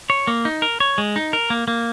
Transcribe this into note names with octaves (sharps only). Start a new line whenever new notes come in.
C#5
A#3
D#4
A#4
C#5
G#3
D#4
A#4
A#3
A#3